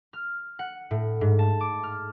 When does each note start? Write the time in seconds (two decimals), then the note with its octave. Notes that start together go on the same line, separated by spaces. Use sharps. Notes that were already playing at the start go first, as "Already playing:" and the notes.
0.13 F6
0.59 F#5
0.91 A2
1.21 G#2
1.39 A5
1.61 D6
1.83 F6